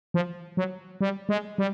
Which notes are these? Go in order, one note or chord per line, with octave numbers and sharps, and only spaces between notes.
F3
F#3
G3
G#3
G3